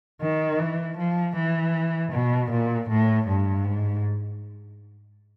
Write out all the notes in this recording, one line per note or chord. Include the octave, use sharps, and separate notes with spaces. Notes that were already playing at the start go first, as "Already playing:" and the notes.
D#3
E3
F3
E3
B2
A#2
A2
G2
G#2